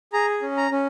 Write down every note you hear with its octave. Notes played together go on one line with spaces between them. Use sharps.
G#4 A#5
C#4
A#5
C#4